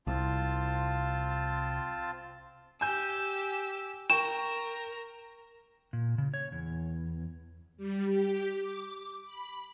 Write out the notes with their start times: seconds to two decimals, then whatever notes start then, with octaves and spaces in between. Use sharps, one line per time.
0.07 C2 C4 F4 A5
2.81 G4 G#5 E6 G6
4.10 A#4 G5 C#6 E7
5.93 A#2
6.18 C#3
6.34 C#5
6.52 E2
7.77 G3
8.06 G4
8.57 D6
9.24 B5